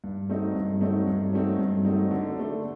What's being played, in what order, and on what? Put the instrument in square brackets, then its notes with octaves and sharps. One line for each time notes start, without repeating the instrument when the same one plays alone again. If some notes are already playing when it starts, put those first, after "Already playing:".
[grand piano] G2
F#3 A3 C4 D#4
G2
F#3 A3 C4 D#4
G2
F#3 A3 C4 D#4
G2
F#3 A3 C4 D#4
D3
A3 D4